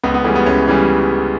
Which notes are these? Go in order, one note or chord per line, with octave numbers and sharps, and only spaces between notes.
C#2 B3
B3
C#3 E3 G3 A3
B3
C#2 C#4
C#3 E3 G3